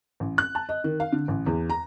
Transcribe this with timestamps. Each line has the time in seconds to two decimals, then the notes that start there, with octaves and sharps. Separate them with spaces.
0.20 A1
0.38 F#6
0.55 A5
0.69 D#5
0.84 D#3
1.00 F5
1.13 D3
1.28 A1
1.46 E2
1.70 A#5